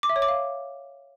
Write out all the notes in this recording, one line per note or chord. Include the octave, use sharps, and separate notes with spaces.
D6
E5
C#5
D6
F5